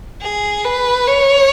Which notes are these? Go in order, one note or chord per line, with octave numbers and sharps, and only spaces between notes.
G#4
B4
C#5